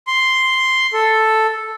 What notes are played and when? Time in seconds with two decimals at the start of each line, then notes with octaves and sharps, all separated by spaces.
0.07 C6
0.93 A4